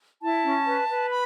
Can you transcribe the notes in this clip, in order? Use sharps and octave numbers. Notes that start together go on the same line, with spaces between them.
E4 A5
C#4
B4
B4
B5